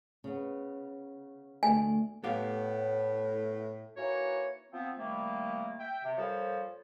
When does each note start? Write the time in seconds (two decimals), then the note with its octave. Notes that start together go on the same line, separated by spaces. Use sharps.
0.24 C#3 B3
1.63 D2 A3 G#5
2.24 A2 B3 G4 F5
3.97 E3 A#3 D#4 F#4 C#5
4.72 F3 B3 C4
4.98 C3 D#3 G3 A3 A#3
5.79 E5 G5
6.03 C3
6.17 A#2 F3 G3 A4 C5 C#5